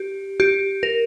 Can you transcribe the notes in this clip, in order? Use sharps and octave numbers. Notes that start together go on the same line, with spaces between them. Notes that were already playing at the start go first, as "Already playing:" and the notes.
Already playing: G4
G4
A#4